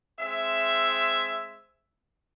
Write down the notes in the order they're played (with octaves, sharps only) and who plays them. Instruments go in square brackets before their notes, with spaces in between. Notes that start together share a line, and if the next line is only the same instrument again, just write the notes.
[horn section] G#3 C4 E5